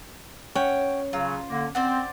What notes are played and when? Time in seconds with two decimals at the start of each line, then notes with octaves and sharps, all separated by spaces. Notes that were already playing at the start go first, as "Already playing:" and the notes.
0.55 C#4 C#5 F#5 G5
1.13 C#3 F#3 F4
1.49 D3 A#3
1.75 C4 C5 D5 F#5